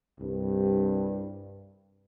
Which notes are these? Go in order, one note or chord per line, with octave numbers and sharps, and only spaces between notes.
C2 G2